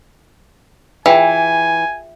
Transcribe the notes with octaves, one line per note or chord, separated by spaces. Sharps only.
E3 F4 G#4 E5 G5 G#5